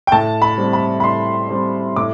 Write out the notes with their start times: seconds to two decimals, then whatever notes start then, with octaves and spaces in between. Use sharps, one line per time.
0.07 G5
0.12 A2 A5
0.42 B5
0.57 G3 C4
0.73 B5
1.00 B5
1.04 A2 C6
1.51 G3 C4
1.96 A2 D6